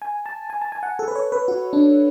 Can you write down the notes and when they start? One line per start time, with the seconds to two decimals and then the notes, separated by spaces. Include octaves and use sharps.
0.02 G#5
0.26 A5
0.50 G#5
0.61 A5
0.72 G#5
0.83 F#5
0.99 A4
1.08 B4
1.15 C#5
1.32 B4
1.48 F#4
1.73 D4